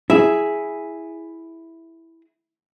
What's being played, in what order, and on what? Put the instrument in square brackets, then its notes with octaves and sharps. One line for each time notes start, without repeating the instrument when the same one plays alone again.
[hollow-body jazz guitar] E4 G#4 [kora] E5